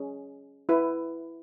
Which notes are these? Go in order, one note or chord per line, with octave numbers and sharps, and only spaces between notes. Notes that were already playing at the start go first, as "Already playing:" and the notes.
Already playing: C#4 G#4
E4 B4